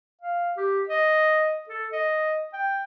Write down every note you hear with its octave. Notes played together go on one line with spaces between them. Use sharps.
F5
G4
D#5
A4
D#5
G5